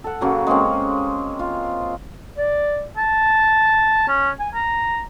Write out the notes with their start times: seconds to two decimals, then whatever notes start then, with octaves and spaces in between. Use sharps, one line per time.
0.04 A4 F#5
0.21 C#3 F#3 A#3
0.47 G#3 A#3 C4 C#4
1.39 F4
2.38 D5
2.97 A5
4.08 C#4
4.40 G#5
4.54 A#5